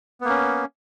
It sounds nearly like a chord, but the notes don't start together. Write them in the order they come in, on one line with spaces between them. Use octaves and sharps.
B3 A#3 C#4